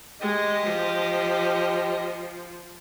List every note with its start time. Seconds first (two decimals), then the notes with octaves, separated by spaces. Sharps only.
0.21 G#3 G4 D#5
0.67 F3